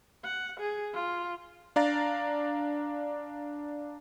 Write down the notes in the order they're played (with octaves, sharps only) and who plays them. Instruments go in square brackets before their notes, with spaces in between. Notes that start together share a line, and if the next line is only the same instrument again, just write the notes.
[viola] F#5
G#4
F4
[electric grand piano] D4 D5 F5 A#5 A6